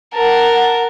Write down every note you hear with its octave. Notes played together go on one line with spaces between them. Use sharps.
A#4 F#5 A5